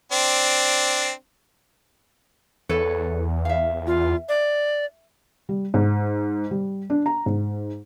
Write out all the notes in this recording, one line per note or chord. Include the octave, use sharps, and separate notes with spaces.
C4 D4
E2 A4 B4 C#5
E5 F5
F4
D5
G3
G#2
G3
D4
A#5
G#2